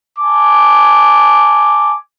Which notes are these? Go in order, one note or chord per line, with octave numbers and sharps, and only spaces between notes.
G#5 A5 D6